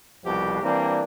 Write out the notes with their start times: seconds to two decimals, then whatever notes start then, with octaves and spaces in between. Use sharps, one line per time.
0.24 C2 F2 B2 F3 G4
0.63 E3 G3 A#3 C4 D4